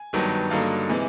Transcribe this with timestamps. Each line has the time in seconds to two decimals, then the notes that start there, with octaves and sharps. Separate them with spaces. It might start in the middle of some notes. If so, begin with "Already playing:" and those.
Already playing: G#5
0.13 G#1 G2 D#3 F#3 B3
0.50 G2 D3 F#3 A#3 D#4 F5
0.89 C3 E3 G#3